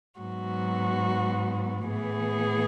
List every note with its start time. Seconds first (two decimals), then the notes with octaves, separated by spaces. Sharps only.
0.20 G#2 F#3 B3 F#4
1.88 A2 E3 B3 G#4